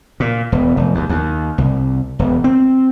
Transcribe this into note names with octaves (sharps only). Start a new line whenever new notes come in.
A#2
E1
F1
D#2
D#2
C2
E1
C4